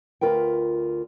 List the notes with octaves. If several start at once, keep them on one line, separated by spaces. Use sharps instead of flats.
D2 F4 A#4 B4 G5